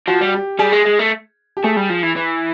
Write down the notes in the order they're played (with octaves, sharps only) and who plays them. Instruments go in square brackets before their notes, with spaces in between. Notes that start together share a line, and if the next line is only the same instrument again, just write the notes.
[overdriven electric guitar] F3 [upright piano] F#4
[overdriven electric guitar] G3
[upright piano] G4
[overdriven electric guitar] G3 [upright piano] G#4
[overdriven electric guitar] G#3
G#3
A3
[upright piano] G4
[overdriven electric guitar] A3 [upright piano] G#4
[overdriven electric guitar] G3
F3
E3
E3